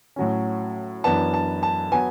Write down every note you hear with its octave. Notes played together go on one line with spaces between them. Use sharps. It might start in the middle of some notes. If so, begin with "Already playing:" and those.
A2 F#3 C#4
F#2 E3 B3 D4 A5
A5
A5
F#3 B3 G#5